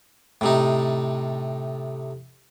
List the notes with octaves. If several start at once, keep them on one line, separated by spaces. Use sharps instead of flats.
A2 C3 D#4